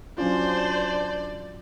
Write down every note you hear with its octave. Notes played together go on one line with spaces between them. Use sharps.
F#3 C#4 D4 F4 C5 D5